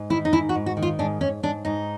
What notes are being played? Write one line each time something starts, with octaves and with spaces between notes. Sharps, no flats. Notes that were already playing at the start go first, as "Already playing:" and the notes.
Already playing: G#2
D#3 E4
D#4
G#2 E4
F#4
G#2
F#4
D#3
F4
G#2 D4
G#2 C#4
G#2 D4
G#2 D#4